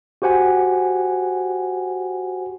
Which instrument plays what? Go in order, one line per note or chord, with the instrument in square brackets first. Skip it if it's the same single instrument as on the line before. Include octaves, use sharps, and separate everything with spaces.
[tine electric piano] F#4 G4 C5 F#5 G#5